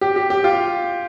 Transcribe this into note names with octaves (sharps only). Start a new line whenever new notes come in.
G4
G4
G4
F4